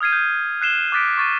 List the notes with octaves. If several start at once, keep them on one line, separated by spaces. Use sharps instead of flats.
D#6 F6 G#6 C7 D#7
G6
F#6 C7 E7 G7
D6 D#6 F#6 A6 B6 D7
C#6 A6 D#7